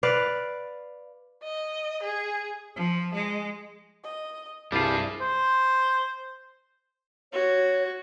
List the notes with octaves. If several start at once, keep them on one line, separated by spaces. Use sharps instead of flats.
B4 D5 F5
D#5
G#4
F3
G#3
D#5
C2 G2 G3 D4 E4 F4 G#4
C5
F#4 C#5